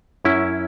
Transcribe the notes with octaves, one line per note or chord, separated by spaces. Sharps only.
F#2 C#4 E4